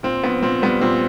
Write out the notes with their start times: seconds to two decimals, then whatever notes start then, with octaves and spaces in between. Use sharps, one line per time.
0.03 A#2 C4
0.23 A#1 B3
0.43 A#2 C4
0.62 G3 B3
0.81 A#2 C4